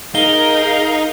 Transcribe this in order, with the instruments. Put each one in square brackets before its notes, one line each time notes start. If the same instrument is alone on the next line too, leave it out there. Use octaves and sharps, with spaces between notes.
[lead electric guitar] D#4 [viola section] G#4 A#4 [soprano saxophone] F5 [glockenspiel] G7